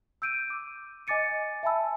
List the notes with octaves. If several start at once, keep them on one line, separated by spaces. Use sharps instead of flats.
E6 G6 D7 D#7
D6
D#5 G#5 D6 A6 C#7 D#7
E5 G#5 A5 B5 E6